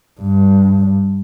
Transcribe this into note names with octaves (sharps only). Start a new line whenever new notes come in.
G2